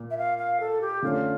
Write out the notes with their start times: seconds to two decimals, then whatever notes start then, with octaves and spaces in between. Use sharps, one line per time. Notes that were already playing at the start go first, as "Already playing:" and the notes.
Already playing: A#2
0.10 E5
0.18 F5
0.38 F5
0.60 A4
0.81 G4
1.02 D3 A3 C#4 F4